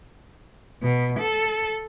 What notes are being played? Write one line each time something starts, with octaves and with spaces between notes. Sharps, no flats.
B2
A4